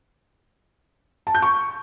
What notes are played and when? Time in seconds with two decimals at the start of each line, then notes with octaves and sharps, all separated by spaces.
1.27 A5
1.35 G6
1.42 C#6